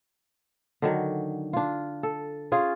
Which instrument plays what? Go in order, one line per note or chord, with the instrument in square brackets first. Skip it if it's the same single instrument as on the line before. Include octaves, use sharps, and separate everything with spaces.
[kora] D3 D#3 F#3
D4 F4
A4
C#4 F4 G#4